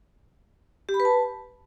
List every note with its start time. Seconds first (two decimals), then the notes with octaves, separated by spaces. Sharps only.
0.89 G4
0.94 B5
1.00 B4
1.05 A5